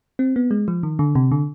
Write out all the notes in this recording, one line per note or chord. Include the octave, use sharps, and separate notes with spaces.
C4
B3
G#3
F3
D#3
D3
C3
D3